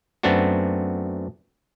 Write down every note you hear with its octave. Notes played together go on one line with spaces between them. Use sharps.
F#2 A3 B3 C4 D4 F#4